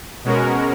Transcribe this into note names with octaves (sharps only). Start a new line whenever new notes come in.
B2 G#3 C#4 F#4 A#4